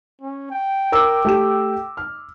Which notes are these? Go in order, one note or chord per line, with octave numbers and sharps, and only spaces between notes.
C#4
G5
A#4 D6 E6
A3 G4 E7
F6